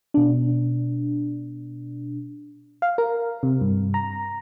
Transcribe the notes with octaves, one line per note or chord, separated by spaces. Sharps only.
B2 D4
F5
A#4
C3
G2
A#5